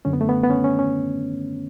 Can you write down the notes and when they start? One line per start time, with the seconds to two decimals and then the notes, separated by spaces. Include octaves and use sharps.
0.05 F#2 D3 C#4
0.13 B3
0.21 A3
0.29 B3
0.43 B3
0.50 C#4
0.64 C#4
0.79 C#4